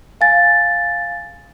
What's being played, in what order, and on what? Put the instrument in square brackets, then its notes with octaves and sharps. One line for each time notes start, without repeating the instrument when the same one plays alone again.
[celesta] F5 G#5 A6